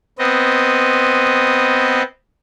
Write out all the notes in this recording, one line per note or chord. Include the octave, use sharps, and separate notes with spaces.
B3 C4 D#5